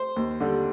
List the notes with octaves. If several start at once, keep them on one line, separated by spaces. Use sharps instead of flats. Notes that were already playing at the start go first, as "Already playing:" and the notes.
Already playing: C5
D#2
D3 G3